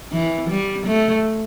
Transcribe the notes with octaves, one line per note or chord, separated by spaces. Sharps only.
E3
G3
A3